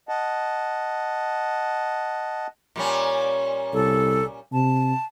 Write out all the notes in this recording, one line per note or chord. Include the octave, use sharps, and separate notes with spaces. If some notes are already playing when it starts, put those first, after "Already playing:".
D#5 F#5 A5
A#2 G3 C#4
C2 A4
C3 A5